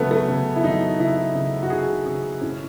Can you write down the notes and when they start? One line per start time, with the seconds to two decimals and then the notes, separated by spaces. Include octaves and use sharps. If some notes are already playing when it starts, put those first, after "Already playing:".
Already playing: C#3 F#3 A3 B3
0.11 A3
0.28 C#3
0.56 E4
0.64 F#3 D#4
0.99 C#3 E4
1.35 C#3
1.63 F#4
1.70 C#3 G#4
2.05 C#3 G#4
2.41 A2 C#4